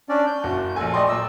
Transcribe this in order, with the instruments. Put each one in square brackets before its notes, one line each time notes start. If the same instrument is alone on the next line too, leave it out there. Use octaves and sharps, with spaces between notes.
[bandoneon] C#4 D4 D5
G6
[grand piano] F#1 F#4
[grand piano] A#1 G#5 [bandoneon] A4
[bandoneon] A3 D#5 [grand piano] D5 G5 C6
[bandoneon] A#2 F#3 E6